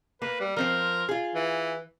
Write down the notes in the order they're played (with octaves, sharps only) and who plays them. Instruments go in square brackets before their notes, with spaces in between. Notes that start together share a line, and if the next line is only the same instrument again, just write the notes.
[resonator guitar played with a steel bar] A#3 [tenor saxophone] B4
[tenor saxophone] G3
[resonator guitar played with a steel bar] F3 C4 C5 [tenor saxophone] A#4
[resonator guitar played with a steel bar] F4 G#4
[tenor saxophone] E3